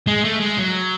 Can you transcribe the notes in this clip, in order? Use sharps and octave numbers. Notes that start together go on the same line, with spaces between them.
G#3
A3
G#3
F#3